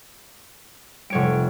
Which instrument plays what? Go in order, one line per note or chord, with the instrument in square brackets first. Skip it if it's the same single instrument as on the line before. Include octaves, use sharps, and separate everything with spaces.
[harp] F1 C#5 D7 [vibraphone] G3 F#5